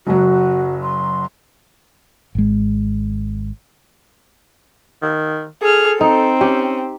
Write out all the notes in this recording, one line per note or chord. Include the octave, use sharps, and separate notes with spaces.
F#1 F#3 F#4
C6
G#1 G#3
D#3
G#4 A4 F6
C4 D#4
C#4 G4